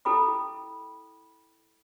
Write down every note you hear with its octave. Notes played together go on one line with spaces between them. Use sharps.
E4 A4 G5 B5 D6